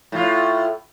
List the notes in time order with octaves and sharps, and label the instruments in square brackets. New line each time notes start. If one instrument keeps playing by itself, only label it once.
[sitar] A2 F4